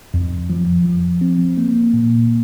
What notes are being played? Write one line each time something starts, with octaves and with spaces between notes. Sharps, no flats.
F2
F3
F3
C4
A#3
A#2